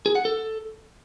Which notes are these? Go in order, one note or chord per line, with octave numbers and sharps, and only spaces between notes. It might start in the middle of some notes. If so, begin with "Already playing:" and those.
G#4
F#5
A4